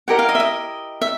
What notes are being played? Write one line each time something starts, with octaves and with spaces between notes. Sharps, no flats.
E4 G4 A#4 D#5 F#5
F5
D#5
E5
D#5
E5